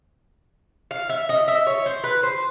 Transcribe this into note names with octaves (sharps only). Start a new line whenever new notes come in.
F5
E5
D#5
E5
C#5
C5
B4
C5